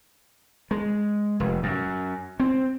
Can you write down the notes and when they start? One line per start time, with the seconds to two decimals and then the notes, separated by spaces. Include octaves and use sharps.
0.71 G#3
1.40 F1
1.63 F#2
2.40 C4